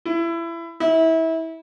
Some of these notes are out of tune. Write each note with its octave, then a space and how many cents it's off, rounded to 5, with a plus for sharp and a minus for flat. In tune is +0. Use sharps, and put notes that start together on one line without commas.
E4 +25
E4 -25